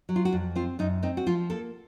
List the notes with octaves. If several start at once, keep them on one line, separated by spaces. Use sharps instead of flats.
F#3
F4
F#4
F2
C4 F4
F#2 D#4
C4 D#4
F#4
F3 F4
A#3 A4